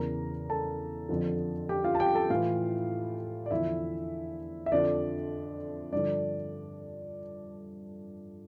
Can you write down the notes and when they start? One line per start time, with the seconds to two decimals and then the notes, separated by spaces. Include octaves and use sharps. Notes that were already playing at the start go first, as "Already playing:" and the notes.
Already playing: E2 C#3 E3 A#4 A#5
0.50 A4 A5
1.09 F2 D3 F3
1.69 G4 G5
1.84 F4 F5
1.95 A5
2.00 G4 G5
2.15 A4 A5
2.30 A2 E3 F4 F5
3.46 D5
3.51 E2 D3 F3 E4 E5
4.66 E5
4.72 F2 D3 F3 D4 D5
5.93 G2 D3 F3 D4 D5